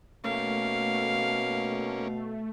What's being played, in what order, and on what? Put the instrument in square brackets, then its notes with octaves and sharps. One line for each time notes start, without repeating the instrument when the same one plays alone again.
[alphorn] B2 [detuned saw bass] A3 [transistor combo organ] A#3 C#4 [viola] F5